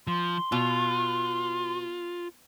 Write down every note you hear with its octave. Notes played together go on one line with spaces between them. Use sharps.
F3 C6
B2 F4